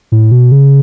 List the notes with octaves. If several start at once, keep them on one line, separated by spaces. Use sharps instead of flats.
A2
B2
C#3